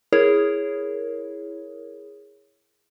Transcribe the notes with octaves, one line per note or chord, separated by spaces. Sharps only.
E4 G#4 A#4 C#5